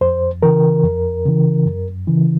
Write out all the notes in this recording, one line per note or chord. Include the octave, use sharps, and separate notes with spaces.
F2 C5
C#3 E3 A#4
F2
C#3 E3
F#2
C#3 E3